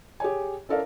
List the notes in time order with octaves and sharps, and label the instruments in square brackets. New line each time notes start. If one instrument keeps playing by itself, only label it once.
[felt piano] G4 G#4 C#5 G#5
C#4 E4 A4 A#4 D5 F5